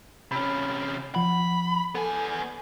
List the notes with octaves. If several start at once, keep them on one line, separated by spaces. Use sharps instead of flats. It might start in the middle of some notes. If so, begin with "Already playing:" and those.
C3 C#4 B5
F3 F#5 B5
B3 A4 G#5